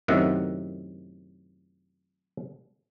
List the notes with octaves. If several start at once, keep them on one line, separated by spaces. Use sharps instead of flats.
F#2 A2 C3 D#3 E5 F#5